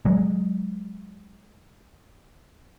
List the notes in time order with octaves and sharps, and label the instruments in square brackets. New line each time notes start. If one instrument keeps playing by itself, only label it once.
[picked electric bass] F#3 G#3